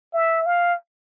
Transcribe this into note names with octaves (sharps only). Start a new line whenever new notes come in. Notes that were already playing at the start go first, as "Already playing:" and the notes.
E5
F5